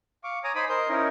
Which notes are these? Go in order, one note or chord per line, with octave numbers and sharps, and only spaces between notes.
F5 C#6 D6
C#5 G#5 A#5 D6 D#6
D#4 C5 G#5 B5 D6 D#6
A#4 C5 D#5 G6
C#4 D#4 E4 A#4